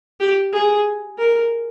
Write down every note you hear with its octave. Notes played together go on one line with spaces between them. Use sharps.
G4
G#4
A#4